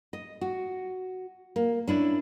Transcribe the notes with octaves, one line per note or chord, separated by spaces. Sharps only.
D#5
F#4
A#3
C#4 D4 E4